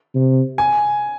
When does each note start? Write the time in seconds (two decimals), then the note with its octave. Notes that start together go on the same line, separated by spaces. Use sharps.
0.15 C3
0.58 G#5